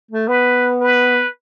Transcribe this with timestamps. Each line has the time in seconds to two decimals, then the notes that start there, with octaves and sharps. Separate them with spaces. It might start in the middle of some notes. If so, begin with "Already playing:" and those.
0.11 A3
0.28 B3 B4
0.81 B4